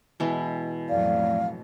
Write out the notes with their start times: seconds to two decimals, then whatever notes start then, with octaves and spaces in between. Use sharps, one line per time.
0.20 B2 E3 G#3
0.89 F2 A2 F#3 D5 F5